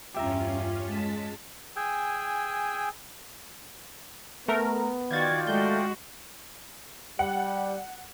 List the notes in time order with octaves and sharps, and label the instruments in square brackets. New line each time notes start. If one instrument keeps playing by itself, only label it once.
[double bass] E2 G2 [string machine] C#4 F4 [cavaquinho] G4 E5 A#5
[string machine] G#3 A5 B6
[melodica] G#4 G5 G#5 E6
[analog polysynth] A3 A#4 [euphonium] B3
[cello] D#3 F#4 [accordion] F4 D5 G5 [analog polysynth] G#6 A6
[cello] G#3 F#4 [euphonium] A3 [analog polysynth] G6
[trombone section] G3 [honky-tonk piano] F#5